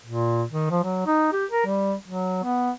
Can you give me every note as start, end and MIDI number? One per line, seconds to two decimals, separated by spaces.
0.06 0.43 46
0.51 0.68 51
0.70 0.83 53
0.84 1.01 54
1.07 1.31 63
1.33 1.46 67
1.51 1.66 70
1.66 1.94 55
2.08 2.41 54
2.44 2.71 59